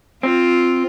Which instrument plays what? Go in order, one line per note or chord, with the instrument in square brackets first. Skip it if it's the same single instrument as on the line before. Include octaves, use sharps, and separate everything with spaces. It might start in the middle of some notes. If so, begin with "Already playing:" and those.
[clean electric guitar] C4 [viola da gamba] F4